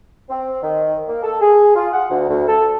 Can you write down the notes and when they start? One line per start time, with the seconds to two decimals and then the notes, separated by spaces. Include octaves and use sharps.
0.29 C4
0.62 D#3
1.08 A#3
1.23 A4
1.42 G#4
1.75 F4
1.93 F#5
2.10 D2
2.29 D2
2.47 A4